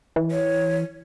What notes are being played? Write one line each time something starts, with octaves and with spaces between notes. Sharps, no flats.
E3
C#5